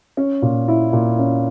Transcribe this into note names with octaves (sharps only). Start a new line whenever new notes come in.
C#4
A#2
E4
A#2
C#4